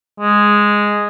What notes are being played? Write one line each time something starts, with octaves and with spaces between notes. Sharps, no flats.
G#3